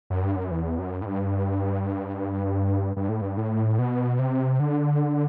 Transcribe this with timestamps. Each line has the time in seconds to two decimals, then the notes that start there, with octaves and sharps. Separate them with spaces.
0.10 F#2
0.23 G2
0.36 F#2
0.51 E2
0.79 F#2
1.02 A2
1.06 G2
2.96 G2
3.09 A2
3.21 G2
3.37 A2
3.79 B2
4.19 C3
4.60 D3